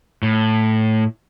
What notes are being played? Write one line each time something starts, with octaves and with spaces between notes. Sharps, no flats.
A2